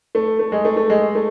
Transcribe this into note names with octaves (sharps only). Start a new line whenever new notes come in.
A3
A3
G#3
A3
A3
G#3
A3